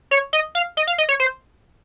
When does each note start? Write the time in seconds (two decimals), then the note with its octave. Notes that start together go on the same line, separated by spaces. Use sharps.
0.11 C#5
0.33 D#5
0.55 F5
0.77 D#5
0.87 F5
0.98 D#5
1.09 C#5
1.20 C5